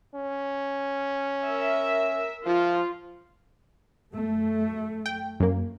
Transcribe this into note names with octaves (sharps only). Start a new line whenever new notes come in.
C#4
A#4 E5
F3 F4
F#2 A3
G5
F#2 A#3